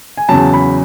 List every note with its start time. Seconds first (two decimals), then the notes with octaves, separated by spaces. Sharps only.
0.17 G#5
0.29 E2 C#3 F#3 A5
0.53 B5